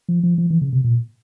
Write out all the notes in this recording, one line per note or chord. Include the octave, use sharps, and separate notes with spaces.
F3
F3
F3
E3
C#3
C3
A#2